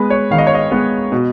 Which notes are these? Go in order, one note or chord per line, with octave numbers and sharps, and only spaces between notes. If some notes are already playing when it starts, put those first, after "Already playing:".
Already playing: G#3 B3 B4
C#5
D#3 F5
D#5
C#5
D#5
G#3 B3
B2